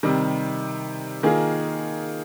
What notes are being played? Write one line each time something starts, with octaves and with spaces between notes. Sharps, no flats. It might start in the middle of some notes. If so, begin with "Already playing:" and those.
C3 D#3 G3
D#3 A#3 F4 G#4